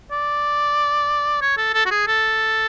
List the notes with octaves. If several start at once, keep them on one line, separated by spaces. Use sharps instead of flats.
D5
C#5
A4
A4
F#4
G#4
A4